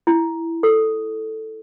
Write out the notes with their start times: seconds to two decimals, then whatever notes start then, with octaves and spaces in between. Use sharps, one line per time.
0.07 E4
0.63 A4